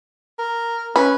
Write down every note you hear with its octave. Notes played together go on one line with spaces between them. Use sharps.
A#4
C#4 B4